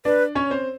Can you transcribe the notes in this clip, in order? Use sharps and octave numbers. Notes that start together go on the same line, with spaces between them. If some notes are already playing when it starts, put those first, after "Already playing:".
D4 B4 D5
C#4 C#5
C4 C5